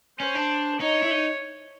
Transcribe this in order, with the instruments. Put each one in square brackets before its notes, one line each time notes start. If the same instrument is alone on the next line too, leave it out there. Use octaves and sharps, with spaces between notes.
[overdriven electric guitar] C#4 [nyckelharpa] C5
[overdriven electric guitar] D4
[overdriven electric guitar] D#4 [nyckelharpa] C#5
[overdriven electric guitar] E4
D#4